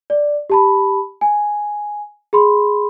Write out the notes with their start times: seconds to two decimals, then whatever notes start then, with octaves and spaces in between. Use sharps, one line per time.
0.10 D5
0.50 G4 A5 B5
1.21 G#5
2.33 G#4 B5 C6